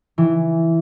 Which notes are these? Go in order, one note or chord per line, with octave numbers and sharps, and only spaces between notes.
E3